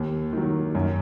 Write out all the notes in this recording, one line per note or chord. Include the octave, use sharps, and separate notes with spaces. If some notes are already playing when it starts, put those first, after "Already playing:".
Already playing: D#2
D#3 F#3
F#2